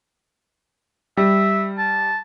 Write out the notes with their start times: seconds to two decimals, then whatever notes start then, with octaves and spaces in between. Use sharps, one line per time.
1.17 G3 E5
1.78 A5